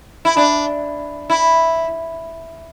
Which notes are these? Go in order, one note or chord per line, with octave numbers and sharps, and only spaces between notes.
E4
D4
E4